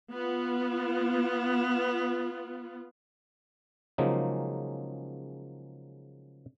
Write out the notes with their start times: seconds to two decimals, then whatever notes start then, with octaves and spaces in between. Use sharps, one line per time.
0.12 B3 F4
3.98 C#3 F3 F#3 G#3 A#3 D#4